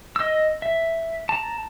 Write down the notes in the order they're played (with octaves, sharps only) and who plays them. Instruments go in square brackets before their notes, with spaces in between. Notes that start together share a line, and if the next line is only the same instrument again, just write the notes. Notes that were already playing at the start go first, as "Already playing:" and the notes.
[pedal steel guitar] D#5 E6
E5
A5 A#5